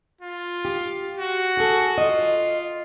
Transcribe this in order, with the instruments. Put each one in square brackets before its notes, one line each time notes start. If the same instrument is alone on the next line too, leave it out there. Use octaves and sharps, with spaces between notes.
[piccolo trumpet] F4
[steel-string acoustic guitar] G4
[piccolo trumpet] F#4
[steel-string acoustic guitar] G#4 A4
[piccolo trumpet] F4 [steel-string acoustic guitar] D#5